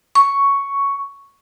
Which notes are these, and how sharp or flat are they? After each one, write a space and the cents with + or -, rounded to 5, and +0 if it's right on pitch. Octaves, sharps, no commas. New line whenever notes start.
C#6 +5